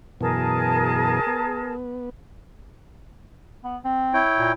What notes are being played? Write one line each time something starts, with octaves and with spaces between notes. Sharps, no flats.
F#2 B2 E3 G#4 A#4 A5
B3
B3
C4
E4 C#5 G5
A#2